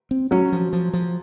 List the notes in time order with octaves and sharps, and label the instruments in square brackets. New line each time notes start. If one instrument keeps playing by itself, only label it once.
[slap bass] C4
[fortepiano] F#3 [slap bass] C#4
[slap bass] F3
F3
F3